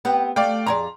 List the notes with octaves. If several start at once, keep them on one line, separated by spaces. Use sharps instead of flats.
B3 C4 G4
A3 D5 F5 G5
F2 G#4 D5 A#5 C6